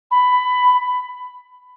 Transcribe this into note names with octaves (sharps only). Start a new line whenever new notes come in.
B5